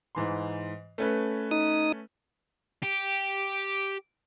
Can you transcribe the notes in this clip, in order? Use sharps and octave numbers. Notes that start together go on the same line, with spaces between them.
G#2 E3 C6
A3 C#4 B4
D#4 D#6
G4